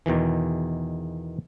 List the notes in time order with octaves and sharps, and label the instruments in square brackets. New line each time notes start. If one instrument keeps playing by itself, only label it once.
[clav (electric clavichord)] E2 B2 D#3 E3